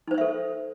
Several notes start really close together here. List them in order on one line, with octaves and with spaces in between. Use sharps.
D#4 C5 C#5 E5 A4